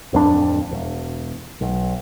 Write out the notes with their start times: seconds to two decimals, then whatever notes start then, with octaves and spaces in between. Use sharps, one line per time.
0.13 D1 F2 D4
0.71 E1
1.61 B1